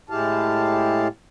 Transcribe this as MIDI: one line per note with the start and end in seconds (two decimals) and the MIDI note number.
0.10 1.08 45
0.10 1.08 56
0.10 1.08 64
0.10 1.08 67
0.10 1.08 77
0.10 1.08 81